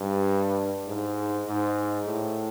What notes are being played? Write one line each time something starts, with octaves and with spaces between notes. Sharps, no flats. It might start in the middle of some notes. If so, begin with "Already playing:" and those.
Already playing: G2
G#2
G#2
A2